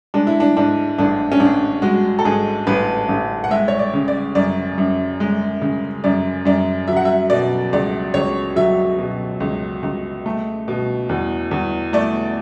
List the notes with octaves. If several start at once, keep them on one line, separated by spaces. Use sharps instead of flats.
G#3 D4
E4
D4
G#2 D4
A1 D4
C#4
A1 D4
G#3 F#4
A4
G#2 G#4
A1 B4
A1
F#5
G#3 E5
C#5
D5
C#3
D5
F#2 D5
F#2
G#3
C#3
F#2 D5
F#2 D5
F#3 E5
F#5
E5
B2 D5
C#2 D5
C#2 C#5
F#3 E5
B2
C#2
C#2
A3
B2
E2
E2
A3 D5